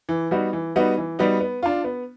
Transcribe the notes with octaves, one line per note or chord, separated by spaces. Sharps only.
E3
G3 B3 D#4 F#4
E3
G3 B3 D#4 F#4
E3
G3 B3 D#4 F#4
B3
D4 F4
B3